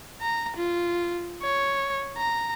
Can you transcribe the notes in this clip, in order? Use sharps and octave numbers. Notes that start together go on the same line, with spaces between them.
A#5
F4
C#5
A#5